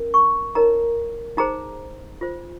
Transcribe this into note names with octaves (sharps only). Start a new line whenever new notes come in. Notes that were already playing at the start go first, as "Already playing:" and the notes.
Already playing: C#4 A#4
C#6
D#4 A#4 C#5 A#5
D#4 G#4 C5 A#5
F4 C5